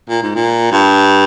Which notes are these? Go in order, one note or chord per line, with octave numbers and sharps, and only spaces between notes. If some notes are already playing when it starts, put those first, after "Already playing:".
A#2
G#2
A#2
G2